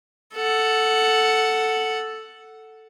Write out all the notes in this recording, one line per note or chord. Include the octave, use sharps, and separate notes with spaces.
A4 F#5